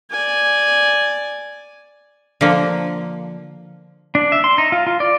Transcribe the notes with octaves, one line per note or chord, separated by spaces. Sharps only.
D5 G#5
D3 F3 A#3
D4
E5
C6
D#4
F4
F4
D5